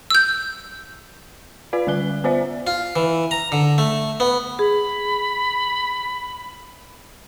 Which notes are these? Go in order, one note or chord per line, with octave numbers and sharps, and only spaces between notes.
E6 G6
F4 B4 D5 F5
D3 G3 D5 F#6 G7
B3 F4 C5 D5 E5
F4
E3
A#5
D3
A3
B3
G#4 B5